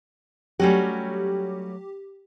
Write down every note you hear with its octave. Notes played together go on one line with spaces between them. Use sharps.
F#3 G3 A3 C#4 F#4 G4